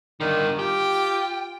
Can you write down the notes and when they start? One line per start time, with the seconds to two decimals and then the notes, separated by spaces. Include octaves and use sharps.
0.21 G2 D3 D#3
0.59 F4 G4 G5